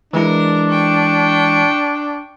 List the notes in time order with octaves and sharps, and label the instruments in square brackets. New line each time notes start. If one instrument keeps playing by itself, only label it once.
[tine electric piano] E3 G#3 E4 [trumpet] D4 [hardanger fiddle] A#4 A#5
[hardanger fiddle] G5 C#6